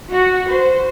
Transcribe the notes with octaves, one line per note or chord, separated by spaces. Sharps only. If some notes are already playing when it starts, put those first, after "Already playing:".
F#4
C5